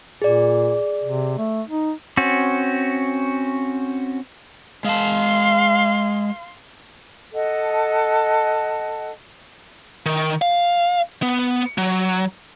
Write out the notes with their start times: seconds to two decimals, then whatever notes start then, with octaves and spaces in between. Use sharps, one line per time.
0.22 A#2 G#4 D5
1.03 C3
1.38 A3
1.68 D#4
2.17 C4 C#4 F#4
4.84 G#3 F5 A5 C6
7.34 A4 D#5 F#5 A5
10.06 D#3
10.42 F5
11.22 B3
11.78 F#3